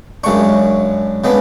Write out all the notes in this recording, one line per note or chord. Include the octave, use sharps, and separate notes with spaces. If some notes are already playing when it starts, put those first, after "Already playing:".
F#2 C#3 G#3 D4 C#6
C#3 G#3 B3 D4